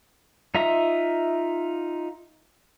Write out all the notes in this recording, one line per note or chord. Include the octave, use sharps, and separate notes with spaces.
D#4 F4 E5 A#5 D#6